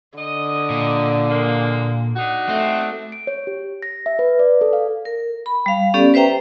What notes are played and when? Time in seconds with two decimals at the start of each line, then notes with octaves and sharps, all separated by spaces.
0.18 D3 D#5
0.70 A#2
1.30 G#3 A#3
2.16 D4 D#4 F#4
2.49 A3 C4
3.12 D7
3.27 C#5
3.47 G4
3.82 A#6
4.06 E5
4.19 B4
4.39 D5
4.61 A4
4.73 F5
5.05 A#4
5.46 B5
5.66 G3 F5
5.94 B3 C#4 G4 A4 D5
6.14 B4 C5 E5 G5 A#5